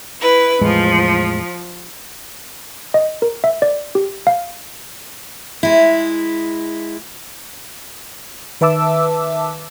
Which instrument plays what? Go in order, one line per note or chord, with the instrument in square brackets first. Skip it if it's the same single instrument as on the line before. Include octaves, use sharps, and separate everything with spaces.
[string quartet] E4 B4
[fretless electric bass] E2 A2 G#3 [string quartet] F3
[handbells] D#5
A#4
E5
D5
G4
F5
[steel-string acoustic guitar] G#3 E4
[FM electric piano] D#3 B4 E5 A5 D6 E6